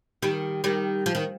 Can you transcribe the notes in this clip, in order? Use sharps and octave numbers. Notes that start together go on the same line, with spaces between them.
D#3 G3
D#3 G3
F3
D#3